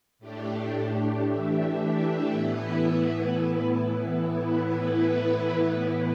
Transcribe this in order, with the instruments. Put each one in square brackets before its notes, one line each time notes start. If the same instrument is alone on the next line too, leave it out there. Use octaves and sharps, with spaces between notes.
[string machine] A2 A3 D4 G4
E3 A3 D4 G4 E5
A2 E3 B3 E4 B4